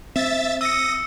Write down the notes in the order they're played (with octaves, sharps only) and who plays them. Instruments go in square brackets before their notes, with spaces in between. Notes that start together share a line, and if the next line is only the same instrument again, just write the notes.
[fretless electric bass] C4 [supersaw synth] E5 A6
[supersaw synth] D#6 A#6 [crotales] E6 C#7